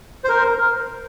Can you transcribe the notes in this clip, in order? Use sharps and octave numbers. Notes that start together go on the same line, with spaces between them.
C5
A#4